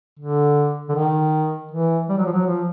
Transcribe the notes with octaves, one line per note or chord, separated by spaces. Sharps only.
D3
D3
D#3
E3
G3
F#3
F3
F#3
F3